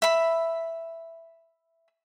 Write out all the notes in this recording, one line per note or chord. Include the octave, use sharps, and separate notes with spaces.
E5 B5